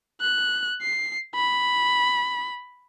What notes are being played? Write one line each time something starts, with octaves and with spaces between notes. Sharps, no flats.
F#6
C7
B5